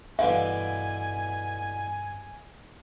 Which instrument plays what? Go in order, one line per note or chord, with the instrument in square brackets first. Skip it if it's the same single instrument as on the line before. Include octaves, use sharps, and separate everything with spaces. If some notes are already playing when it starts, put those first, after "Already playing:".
[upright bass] G2 [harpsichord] B2 D3 E3 [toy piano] F5 [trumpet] G#5